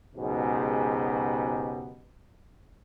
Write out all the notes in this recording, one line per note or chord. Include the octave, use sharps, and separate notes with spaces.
C#2 G#2 B2 F#3 G4